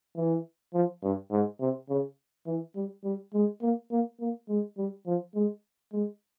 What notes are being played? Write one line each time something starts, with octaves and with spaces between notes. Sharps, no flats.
E3
F3
G2
G#2
C3
C#3
E3
G3
G3
G#3
A#3
A#3
A#3
G#3
G3
F3
G#3
G#3